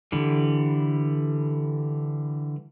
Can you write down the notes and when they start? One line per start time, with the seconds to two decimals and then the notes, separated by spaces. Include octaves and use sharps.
0.12 D3 E3 G3